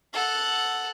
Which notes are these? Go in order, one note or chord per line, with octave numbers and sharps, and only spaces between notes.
A4 F#5